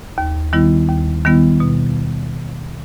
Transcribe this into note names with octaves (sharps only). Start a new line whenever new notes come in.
D#2
D#3 G3 B3 E4
D#2
D#3 G3 B3 E4
B2